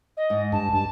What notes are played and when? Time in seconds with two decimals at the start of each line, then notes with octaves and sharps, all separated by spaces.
0.17 D#5
0.30 G#2
0.52 G2 A5
0.73 G2 A5